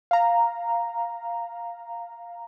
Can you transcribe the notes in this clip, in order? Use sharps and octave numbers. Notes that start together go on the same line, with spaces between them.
F5 A#5